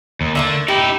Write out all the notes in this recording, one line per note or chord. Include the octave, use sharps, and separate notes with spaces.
D#2
D3 A3 A#3 E5
D#4 E4 G4